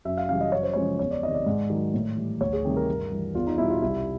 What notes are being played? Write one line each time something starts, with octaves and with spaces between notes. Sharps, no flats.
F#2 E5
F5
C#3 E3 G3 F5
D#5
F#2 C#5
C5
C#3 F3 G#3 C#5
E2 C#5
D5
C3 D#3 D#5
D5
G#2
D#3 F#3
A2
E3 G3
D2 C#5
G#4
C3 D#3 G3 G4
A#4
G2
E3 G3
E2 F4
D#4
B2 G3 E4
F4
C2 E4